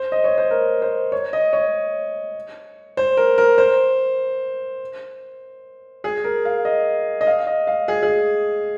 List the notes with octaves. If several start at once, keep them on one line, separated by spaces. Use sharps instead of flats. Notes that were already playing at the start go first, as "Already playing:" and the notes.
Already playing: C5
D#5
C#5
C5
A#4
C5
C#5
D#5
C#5
C5
A#4
A#4
C5
G#4
A#4
F5
D#5
D#5
F5
D#5
F5
G#4
G#4